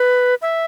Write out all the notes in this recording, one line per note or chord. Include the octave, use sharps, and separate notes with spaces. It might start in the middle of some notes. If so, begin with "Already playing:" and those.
Already playing: B4
E5